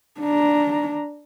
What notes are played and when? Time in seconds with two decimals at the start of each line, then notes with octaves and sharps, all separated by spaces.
0.21 D4 A#5